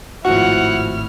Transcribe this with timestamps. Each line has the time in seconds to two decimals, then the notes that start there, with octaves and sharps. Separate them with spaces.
0.25 G#1 A2 F3 E4 F#4 F#5 C#6 F6